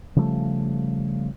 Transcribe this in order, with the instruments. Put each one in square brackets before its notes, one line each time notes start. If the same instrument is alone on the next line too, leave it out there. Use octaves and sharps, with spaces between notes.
[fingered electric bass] C#3 F3 G3 A3